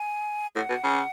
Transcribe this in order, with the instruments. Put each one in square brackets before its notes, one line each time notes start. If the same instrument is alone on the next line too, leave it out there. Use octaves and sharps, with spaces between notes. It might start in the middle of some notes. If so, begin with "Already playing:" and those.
Already playing: [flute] G#5
[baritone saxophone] A2 [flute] F#5
[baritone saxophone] B2
C#3